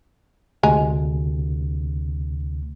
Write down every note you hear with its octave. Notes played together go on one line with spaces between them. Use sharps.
D2 C3 G#3 G#5 A#5